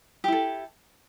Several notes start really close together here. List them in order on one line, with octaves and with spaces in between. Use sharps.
G4 E4 A4